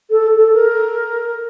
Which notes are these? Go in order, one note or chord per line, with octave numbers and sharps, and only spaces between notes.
A4
A4
A#4